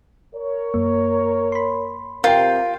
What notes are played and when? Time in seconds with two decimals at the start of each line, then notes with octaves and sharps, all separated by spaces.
0.35 A#4 C#5
0.74 F#2 A#3
1.52 B5 C6
2.24 C3 F4 A#4 G5 G6 C7